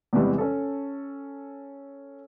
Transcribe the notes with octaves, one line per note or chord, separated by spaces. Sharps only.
E2 C3 E3 G3 G#3
C#4 A4